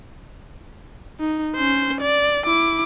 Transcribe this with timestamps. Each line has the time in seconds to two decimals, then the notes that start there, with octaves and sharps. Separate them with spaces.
1.20 D#4
1.56 C#4 C5
2.01 D5
2.45 E4 D6